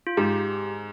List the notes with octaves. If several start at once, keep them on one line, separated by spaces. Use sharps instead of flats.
F4
G#2 G4